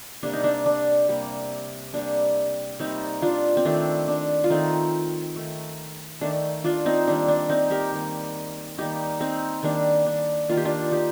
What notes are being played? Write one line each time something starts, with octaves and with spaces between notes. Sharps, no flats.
C3 G3 A#3 D4
D#4
D4
D4
C3 G3 A#3
C3 G3 A#3 D4
C3 G3 A#3 C4 D#4
D4 F4
C4
D#3 A3 D4
D4
F4
D#3 A3 C4 D#4
D#3 A3
D#3 A3 D4
D4 F4
C4 D#4
D#3 G3 A#3 D4
D4
C4 D#4
G4 A#4
D#3 G3 A#3
D#3 G3 A#3 D#4 G4
C4 D#4
D#3 G3 A#3 D4
D4
D#3 A#3 F4
G4
D4 F4
D#4 G4